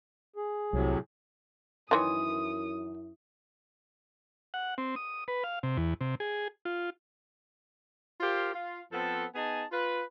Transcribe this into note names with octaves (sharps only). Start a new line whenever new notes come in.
G#4
C2 A2 C3 F#3
F#2 D#3 E3 E4 C#5 C6 D#6
F#5
C4
D#6
B4
F5
C3
E2
C3
G#4
F4
F4 G4 A#4 C5 F5
F4
F3 B3 C4 A4
B3 D#4 G#4 G#5 A5
F4 B4